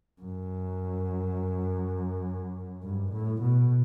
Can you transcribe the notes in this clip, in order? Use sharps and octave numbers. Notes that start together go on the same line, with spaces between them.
F#2
G2
A2
B2